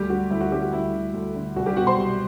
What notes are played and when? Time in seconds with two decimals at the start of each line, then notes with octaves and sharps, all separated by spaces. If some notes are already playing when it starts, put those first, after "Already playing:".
Already playing: D2 G3 G4
0.09 D3 F#4
0.30 D2 E4
0.41 F#4
0.51 D3 G3 G4
0.62 F#4
0.72 D2 E4
0.93 D3
1.14 D2
1.35 D3
1.56 C2 F#4
1.66 G3 G4
1.76 B2 F#4 F#5
1.87 C5 C6
1.98 C2